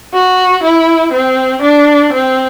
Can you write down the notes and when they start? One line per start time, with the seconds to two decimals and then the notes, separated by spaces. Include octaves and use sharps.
0.13 F#4
0.63 E4
1.12 C4
1.62 D4
2.12 C4